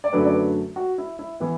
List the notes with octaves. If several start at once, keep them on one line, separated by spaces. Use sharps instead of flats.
D5
F#2 D3 F#3 A3 B4
D5
B4
F#4
E4
E4
E3 B3 E4